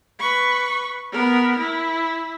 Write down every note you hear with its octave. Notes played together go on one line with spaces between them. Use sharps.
B4 C#6
B3 A#4
E4